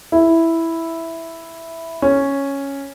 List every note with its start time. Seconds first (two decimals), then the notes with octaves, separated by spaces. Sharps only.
0.12 E4
2.02 C#4